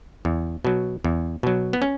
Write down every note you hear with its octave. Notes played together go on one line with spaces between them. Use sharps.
E2
B2 F#3
E2
B2 F#3
B3
C#4